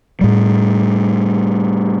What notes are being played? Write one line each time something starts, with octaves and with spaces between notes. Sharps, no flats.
A2 G3